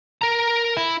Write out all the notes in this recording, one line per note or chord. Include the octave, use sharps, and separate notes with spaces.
A#4 A#5
E4